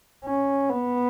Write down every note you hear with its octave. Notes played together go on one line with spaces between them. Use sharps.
C#4
B3